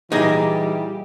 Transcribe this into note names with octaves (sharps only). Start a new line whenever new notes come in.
A#2 E3 G3 D#4 G#4 D#5 E5 A#5